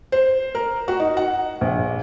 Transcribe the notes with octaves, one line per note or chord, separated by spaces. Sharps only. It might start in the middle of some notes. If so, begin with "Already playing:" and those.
C5
A#4
F#4
D#4
F#5
A#1